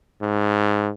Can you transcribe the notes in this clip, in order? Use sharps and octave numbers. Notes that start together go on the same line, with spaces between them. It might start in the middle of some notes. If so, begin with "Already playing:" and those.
G#2